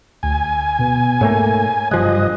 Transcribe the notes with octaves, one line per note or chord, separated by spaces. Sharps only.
D2 G#5
B2 B3
G#2 A3 A#3 C#5
F#1 G2 F3 D#5 F#6